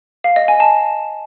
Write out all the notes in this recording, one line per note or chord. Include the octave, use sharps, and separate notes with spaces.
F5
D#5
G#5
A5